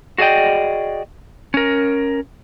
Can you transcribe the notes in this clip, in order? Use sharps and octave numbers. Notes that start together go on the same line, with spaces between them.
F#4 G#4 D5 D#5 G5
C#4 A#4